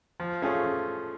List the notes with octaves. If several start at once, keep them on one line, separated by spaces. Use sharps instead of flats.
F3
A3 C#4 F4 G#4